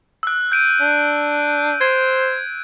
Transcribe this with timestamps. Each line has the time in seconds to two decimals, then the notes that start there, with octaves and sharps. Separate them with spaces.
0.23 E6 F#6
0.52 G6 D7 D#7
0.81 D4
1.81 C5 G#6